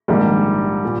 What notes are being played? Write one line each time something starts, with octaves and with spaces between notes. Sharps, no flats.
A#1 G#2 D#3 G3 A#3
A#2